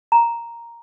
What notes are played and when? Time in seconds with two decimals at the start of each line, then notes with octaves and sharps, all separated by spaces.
0.12 A#5